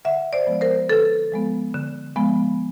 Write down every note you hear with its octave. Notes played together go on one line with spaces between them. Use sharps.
D3 E5 F#5
C5 D5
F3 G#3 B3
A#4 C5
D3 A4 B4
F3 G#3 B3
D3
F3 G#3 B3